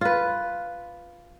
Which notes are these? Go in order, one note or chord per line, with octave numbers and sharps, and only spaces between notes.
F4 B4